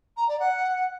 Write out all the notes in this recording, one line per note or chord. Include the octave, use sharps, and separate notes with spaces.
A#5
D5
F#5